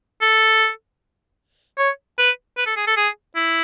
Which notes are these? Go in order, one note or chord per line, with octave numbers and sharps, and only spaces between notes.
A4
C#5
B4
B4
A4
G#4
A4
G#4
E4